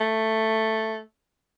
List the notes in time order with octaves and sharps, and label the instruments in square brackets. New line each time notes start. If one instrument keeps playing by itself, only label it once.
[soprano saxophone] A3